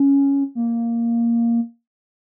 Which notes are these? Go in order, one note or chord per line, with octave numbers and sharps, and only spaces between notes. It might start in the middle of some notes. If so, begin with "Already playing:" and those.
Already playing: C#4
A#3